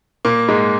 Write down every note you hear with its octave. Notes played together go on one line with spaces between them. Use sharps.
A#2 A#3
G#2 G#3